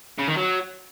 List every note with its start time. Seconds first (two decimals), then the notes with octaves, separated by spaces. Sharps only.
0.18 C#3
0.28 D#3
0.37 F#3